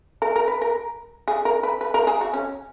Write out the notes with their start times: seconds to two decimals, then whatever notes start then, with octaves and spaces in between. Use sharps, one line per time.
0.22 A#4
0.36 A#4
0.48 B4
0.61 A#4
1.28 G#4
1.45 A#4
1.63 B4
1.81 B4
1.94 A#4
2.07 G#4
2.21 F#4
2.33 C#4